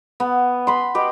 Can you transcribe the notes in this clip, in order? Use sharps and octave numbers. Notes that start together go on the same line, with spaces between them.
B3
B5 C6
G4 B4 D#5